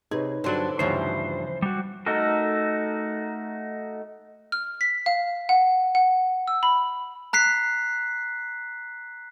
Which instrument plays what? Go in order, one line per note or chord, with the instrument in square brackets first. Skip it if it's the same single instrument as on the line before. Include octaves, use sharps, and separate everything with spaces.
[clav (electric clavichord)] C3 [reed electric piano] D#4 B4 C#5 [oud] G#4
[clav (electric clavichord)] G2 F#3 D4 [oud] D3 C5
[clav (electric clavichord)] D2 G2 [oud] C#3 E3 F3 [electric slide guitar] C5
[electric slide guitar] G3 F#4
[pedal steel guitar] A3 D#4 F#4 A4 A#4
[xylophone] F6
B6
F5
F#5
F#5
E6
B5
[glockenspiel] A#5 F#6 B6 C7